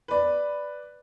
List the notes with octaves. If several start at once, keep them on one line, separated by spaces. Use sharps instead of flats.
B4 D5